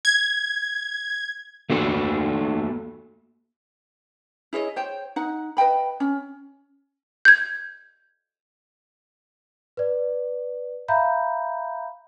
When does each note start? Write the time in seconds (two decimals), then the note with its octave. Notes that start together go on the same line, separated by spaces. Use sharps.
0.05 G#6
1.70 A3 A#3 F#4 A4
4.53 E4 G#4 C#5 D#5
4.76 C5 C#5 G5
5.16 D#4 F#5
5.57 B4 D#5 G5 B5
6.00 C#4
7.25 G6 G#6
9.77 B4 D5
10.88 E5 F5 A#5 B5 G6